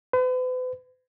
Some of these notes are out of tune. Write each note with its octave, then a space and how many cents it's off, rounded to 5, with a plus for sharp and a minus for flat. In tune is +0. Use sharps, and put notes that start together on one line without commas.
B4 +45